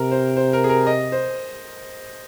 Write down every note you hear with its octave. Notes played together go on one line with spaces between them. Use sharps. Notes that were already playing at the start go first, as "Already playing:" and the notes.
Already playing: C3 A#4
C5
C5
A#4
G#4
A#4
D#5
C5